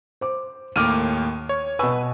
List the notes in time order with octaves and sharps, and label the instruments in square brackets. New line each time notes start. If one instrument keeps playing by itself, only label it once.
[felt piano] C5 D6
[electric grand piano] D#2 A2 A#3 [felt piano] D6 F6 D#7
[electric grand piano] C#5
[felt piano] B2 E6 [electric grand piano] B4 G#5 C#6